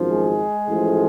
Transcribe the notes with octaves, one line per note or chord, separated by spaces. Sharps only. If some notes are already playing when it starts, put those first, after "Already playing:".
Already playing: G#1 F#2 F3
G#3 G#4
A1 A2 F3